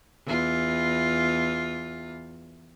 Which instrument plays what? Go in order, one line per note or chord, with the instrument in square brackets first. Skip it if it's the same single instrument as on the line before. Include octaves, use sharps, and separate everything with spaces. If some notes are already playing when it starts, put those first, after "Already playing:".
[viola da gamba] E2 F4